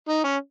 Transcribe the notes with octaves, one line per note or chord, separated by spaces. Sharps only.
D#4
C#4